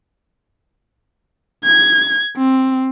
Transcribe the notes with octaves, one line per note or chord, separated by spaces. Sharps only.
G#6
C4